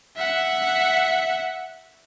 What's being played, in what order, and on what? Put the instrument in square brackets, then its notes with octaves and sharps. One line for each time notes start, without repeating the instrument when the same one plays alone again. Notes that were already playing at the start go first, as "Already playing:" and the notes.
[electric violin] E5 F#5